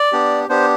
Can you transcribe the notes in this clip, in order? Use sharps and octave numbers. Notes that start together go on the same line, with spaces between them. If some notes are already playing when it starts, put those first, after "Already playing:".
Already playing: D5
B3 D4 G4
B3 D4 G4 C5